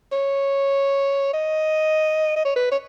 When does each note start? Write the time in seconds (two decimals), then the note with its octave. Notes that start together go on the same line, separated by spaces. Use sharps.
0.12 C#5
1.33 D#5
2.36 D#5
2.45 C#5
2.56 B4
2.71 C#5